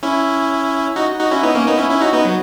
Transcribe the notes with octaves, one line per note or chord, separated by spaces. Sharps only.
C#4 E4
D#4 F#4
D#4 F#4
C#4 E4
B3 D#4
A#3 C#4
B3 D#4
C#4 E4
C#4 E4
D#4 F#4
B3 D#4
F#3